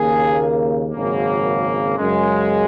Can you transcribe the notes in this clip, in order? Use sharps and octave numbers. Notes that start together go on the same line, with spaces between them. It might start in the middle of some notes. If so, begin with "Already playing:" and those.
Already playing: D#2 C#3 A#3 G#4
G#1 F#2 C#3 A#3
F#2 C#3 G#3